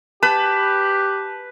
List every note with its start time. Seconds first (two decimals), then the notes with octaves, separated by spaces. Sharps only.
0.23 G4 B4 A5